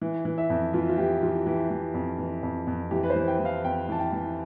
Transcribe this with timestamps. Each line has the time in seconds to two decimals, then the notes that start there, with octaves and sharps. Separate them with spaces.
0.02 E3
0.25 E3
0.38 E5
0.50 F2
0.73 E3 F4
0.89 F4
0.98 E3 G4
1.22 E3 F4
1.46 E3 G4
1.70 E3
1.94 F2
2.19 E3
2.43 F2
2.67 F2
2.91 E3 G4
3.03 B4
3.10 C5
3.16 E3
3.28 G5
3.39 E3
3.45 F5
3.65 F2 G5
3.89 E3 A5
4.00 G5
4.13 E3